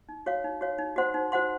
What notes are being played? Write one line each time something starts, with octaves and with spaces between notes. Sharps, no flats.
D#4
F#4 C#5 F5
D#4
F#4 C#5 F5
D#4
F#4 C5 F#5 C6
D#4
F#4 C5 F#5 C6